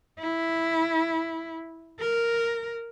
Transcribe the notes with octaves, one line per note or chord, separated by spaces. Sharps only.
E4
A#4